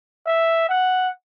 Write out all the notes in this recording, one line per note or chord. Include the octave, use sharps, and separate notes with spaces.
E5
F#5